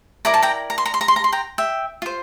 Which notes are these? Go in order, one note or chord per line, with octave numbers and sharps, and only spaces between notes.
E4 A#4 D5 A#5
A5
G5 A#5
A#5
C6
A#5
C6
A#5
C6
A#5
C6
G5 A#5
E5 G5
F4 C5